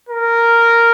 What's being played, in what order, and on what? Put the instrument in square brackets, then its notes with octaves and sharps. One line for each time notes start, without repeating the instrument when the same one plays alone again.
[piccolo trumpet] A#4